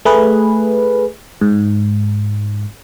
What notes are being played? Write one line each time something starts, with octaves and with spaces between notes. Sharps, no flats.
A3 G#4 B4
G#2